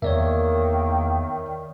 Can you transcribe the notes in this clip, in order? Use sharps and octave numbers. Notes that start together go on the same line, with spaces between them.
E2 D#3 A#3 C#5 D5 E5